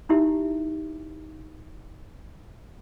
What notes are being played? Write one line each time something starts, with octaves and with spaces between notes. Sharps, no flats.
D#4 E4 G4 E5